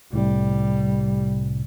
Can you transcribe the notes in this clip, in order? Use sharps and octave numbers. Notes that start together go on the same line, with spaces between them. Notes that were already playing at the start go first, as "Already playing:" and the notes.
C2 A2 C3 G3